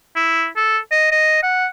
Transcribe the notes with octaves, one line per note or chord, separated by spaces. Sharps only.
E4
A4
D#5
D#5
F#5